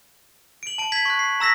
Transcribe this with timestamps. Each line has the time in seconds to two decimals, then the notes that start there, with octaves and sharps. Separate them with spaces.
0.63 D7 F#7
0.78 A5 D7
0.92 G#6 B6 F#7
1.05 C#6 F#6
1.19 C7
1.40 A#5 E6 A#6 B6